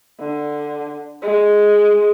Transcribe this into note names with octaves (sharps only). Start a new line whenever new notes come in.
D3
G#3